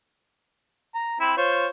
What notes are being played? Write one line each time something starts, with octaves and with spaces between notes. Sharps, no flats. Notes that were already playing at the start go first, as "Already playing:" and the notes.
A#5
C4 E4 B5
F4 C5 C#5